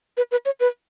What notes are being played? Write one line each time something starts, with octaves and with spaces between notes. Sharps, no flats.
B4
B4
C#5
B4